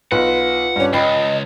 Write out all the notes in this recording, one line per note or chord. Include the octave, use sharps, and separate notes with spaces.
B1 F4 B4 F#5
G2 C#4 D4
C#2 D#5 G5 B5 C7